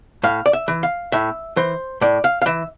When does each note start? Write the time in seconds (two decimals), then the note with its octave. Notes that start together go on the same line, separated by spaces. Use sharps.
0.23 A2 F5
0.46 D5
0.53 E5
0.68 E3
0.83 F5
1.12 A2 E5
1.57 E3 C5
2.01 A2 D5
2.24 F5
2.42 F5
2.46 E3 E5